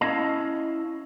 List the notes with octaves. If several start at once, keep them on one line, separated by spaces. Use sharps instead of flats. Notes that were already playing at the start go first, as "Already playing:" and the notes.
C#4 E4 D#5 F5 A5